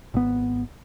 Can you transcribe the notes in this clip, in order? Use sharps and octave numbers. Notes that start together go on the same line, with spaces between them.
G#1 B3